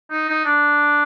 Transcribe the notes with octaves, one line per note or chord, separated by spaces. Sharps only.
D#4
D#4
D4